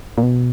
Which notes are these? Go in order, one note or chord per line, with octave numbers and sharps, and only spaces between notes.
A#2
B2